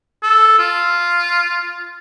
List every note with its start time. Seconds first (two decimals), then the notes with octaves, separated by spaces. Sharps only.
0.23 A4
0.59 F4